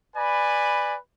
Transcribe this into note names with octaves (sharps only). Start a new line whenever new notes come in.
B4 D5 G#5 B5